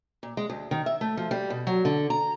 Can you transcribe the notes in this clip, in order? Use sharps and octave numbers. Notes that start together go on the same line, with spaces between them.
A#2
G#3
D2
D#3
E5
A3
F3
G3
B2
F#3
D3
A#5